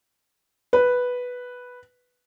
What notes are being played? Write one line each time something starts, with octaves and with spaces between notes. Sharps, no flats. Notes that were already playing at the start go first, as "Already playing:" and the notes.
B4